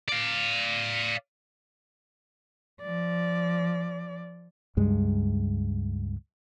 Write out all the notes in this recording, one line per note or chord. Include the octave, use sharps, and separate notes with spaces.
D5 F5
F3 D5
C#2 G2 G#3